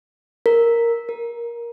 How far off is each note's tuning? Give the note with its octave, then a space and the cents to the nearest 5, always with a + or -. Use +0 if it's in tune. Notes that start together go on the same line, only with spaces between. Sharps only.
A#4 -5
A#4 +15